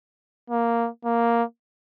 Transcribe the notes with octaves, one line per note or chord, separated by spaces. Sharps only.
A#3
A#3